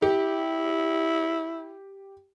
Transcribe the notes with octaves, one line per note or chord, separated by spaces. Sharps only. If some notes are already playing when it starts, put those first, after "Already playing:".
E4 G4